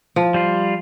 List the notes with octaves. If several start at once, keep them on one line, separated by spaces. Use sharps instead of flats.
F3
G3 F4